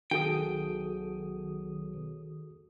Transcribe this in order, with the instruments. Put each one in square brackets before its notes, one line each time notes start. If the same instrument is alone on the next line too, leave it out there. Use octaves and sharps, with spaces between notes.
[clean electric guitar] B1 G5 [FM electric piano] D#3 D#6 [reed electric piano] F#4 G#4 A4